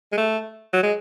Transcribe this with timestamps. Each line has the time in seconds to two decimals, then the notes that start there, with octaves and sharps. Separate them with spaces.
0.12 G#3
0.18 A3
0.73 F#3
0.83 G#3